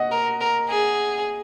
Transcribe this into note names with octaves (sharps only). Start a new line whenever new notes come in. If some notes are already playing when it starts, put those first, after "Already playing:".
Already playing: D#5 F#5
A#4
A#4
G#4